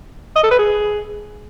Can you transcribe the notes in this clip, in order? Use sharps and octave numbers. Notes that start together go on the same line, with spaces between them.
D#5
A4
B4
G#4